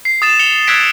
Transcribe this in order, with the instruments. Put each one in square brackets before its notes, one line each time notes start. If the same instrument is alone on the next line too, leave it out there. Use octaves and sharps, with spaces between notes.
[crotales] C7
D#6 A6 E7
C#7 F7 G7
E6 F#6 G#6 A6 B6 D7